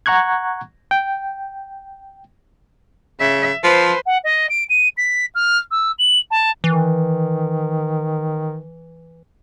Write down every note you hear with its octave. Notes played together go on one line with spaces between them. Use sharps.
F#5 A#5 C#6 F#6 G#6
G5
C#3 E5
F3 B4 C5
F#5
D#5
D7
D#7
B6
F6
E6
F#7
A5
D#3 E3